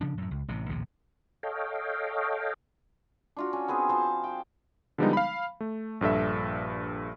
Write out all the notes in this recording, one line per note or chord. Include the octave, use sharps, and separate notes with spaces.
C#3 F3 D4
F#2 A2
C#2
A1 A2 C3
A#1 D#2 A2 C3
A4 C#5 D#5 F5 G5
D4 F4 F#4
C#4
B3 C4 G#4 B4
F3 C5 A5
G5
D3 F3 G3 G#3 B3 D#4
F5 B5
A3
A#1 G2 A4 E5